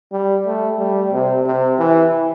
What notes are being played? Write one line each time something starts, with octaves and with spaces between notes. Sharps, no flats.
G3
A3
G3
C3
C3
E3